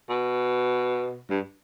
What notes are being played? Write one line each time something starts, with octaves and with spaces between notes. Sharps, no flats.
B2
G2